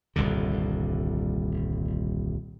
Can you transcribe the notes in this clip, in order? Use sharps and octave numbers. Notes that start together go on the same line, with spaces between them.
D#1 C2 G2 D3